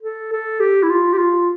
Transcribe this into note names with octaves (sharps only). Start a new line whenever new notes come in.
A4
A4
G4
E4
F4
G4
F4